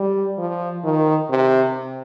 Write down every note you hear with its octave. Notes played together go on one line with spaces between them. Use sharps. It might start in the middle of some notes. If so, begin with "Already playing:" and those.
Already playing: G3
F3
D#3
C3